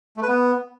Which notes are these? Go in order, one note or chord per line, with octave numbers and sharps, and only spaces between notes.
A3
B4
B3